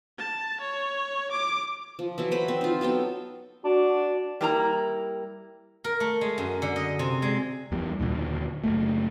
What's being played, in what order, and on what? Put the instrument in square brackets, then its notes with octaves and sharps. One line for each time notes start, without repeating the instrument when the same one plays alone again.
[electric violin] A5
C#5
D6
[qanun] F3
E3 F#3 E4
B4 C5 B5
C4
D#4 F4
F#3 B3 A4 G5
[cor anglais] D4 [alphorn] F#4
[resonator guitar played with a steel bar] G3 A#3 E4 A#4 C5 A#5
[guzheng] A#4
A3
G#3
F#2
D3
D#5
C3
G#3
[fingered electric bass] E2 G3
D#2 A#2 D3
F#1 D#2 A3